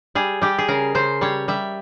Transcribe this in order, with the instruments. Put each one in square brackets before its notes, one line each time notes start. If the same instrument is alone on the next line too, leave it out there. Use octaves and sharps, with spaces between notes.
[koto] G3 G#4
G3 G4
G#4
C#3 A#4
C#3 C5
G3 C#5
G3 E5